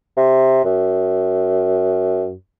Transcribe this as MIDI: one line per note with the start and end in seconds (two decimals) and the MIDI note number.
0.17 0.64 48
0.64 2.33 42